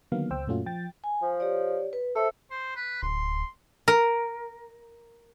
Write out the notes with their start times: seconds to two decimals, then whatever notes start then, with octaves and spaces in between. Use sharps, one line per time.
0.12 D3 D#3 F#3 A#3 B3 F5
0.30 C#2 C5 G5 E6
0.47 F#2 A#2 A3 C#4 F4 F#4
0.66 F3 G5 A6
1.04 G#5
1.22 F3
1.40 G4 C#5 D5
1.93 B4
2.16 A4 C5 E5
2.51 C5
2.76 B4
3.03 D1 C6
3.88 A#4